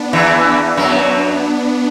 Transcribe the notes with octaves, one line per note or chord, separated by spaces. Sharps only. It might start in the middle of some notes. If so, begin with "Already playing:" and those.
Already playing: B3 D4
E2 E3
F#2 F#3